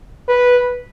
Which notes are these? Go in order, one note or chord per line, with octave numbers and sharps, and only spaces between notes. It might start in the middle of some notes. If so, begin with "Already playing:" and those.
B4